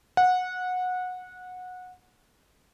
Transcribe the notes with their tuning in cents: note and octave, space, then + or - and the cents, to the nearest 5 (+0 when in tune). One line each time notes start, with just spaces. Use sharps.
F#5 -20